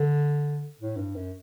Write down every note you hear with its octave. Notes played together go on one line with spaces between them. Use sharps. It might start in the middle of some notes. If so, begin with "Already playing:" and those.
Already playing: D3
A2
G2
F#2